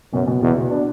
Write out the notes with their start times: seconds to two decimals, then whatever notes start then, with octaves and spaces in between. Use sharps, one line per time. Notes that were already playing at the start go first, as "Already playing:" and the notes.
0.13 F#2 B2
0.27 B2
0.42 E2 B2
0.57 B2
0.71 D4